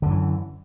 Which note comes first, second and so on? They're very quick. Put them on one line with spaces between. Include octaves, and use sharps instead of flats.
D3 F#2 E3